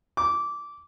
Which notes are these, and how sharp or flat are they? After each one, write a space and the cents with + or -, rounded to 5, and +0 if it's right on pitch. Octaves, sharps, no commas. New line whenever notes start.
D6 -15